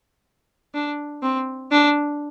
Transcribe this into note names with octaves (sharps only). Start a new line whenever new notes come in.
D4
C4
D4